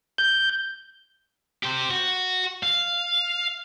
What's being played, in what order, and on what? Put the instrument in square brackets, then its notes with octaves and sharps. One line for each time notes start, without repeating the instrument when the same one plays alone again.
[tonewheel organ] G6
[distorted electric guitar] G4 C5
F#4
F5